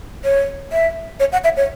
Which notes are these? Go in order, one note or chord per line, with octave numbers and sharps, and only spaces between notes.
C#5
E5
C#5
F#5
E5
C#5